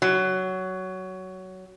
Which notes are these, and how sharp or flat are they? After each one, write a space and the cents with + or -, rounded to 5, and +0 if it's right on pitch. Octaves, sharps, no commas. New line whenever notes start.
F#3 +15